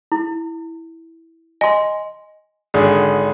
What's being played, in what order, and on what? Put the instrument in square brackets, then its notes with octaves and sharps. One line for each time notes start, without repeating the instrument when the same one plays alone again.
[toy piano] E4
[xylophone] D#5 [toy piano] G#5 C6
[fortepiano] G#1 D3 G#4